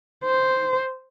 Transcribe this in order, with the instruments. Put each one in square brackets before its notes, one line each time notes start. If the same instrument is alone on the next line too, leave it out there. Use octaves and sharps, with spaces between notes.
[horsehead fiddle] C5